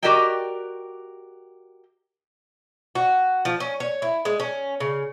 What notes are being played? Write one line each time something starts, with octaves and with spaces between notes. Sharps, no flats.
F#4 G4 A#4 D5 D#5 G5
F#4
F3
C#4
C#5
E4
G#3
C#4
C#3